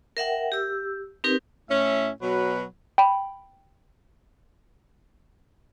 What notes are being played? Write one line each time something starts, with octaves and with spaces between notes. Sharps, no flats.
A#4 E5 F#5 G5
G4 E6
C4 D#4 G4 A#4 B4
A2 C#4 E5
B2 F#3 B4
G5 B5